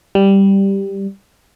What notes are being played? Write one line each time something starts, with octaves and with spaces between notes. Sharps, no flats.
G3